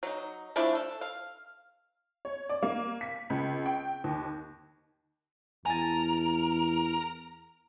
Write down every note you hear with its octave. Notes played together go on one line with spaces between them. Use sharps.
F#3 D#4
F3 A3 D4 E4
A4
F5
C#5
D5
A#3
B6
C#2
G5
D#2
E2 A#4 G#5 A5